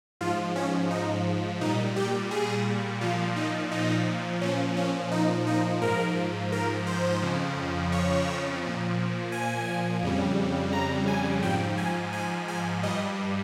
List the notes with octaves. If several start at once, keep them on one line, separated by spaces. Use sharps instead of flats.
G#2 F3 F4
C#4
D#4
A#2 G3 D#4
G4
G#4
A#2 F3 F4
D#4
D#4
A#2 F3 C#4
C#4
D#4
D#4
G#2 F3 A#4
A#4
C5
F2 C#3 F3
C#5
A#2 F3
G#5
F2 C#3 G3
A#5
G#5
G#2 F3 G5
G#5
G#5
G#5
G2 G3 D#5